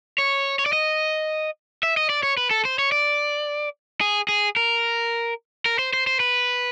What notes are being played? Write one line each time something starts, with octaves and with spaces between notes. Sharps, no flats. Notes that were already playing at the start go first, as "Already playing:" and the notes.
C#5
C#5
D5
D#5
E5
D#5
D5
C#5
B4
A4
C5
C#5
D5
G#4
G#4
A#4
A#4
C5
C5
C5
B4